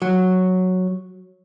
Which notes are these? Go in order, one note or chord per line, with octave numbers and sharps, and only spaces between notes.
F#3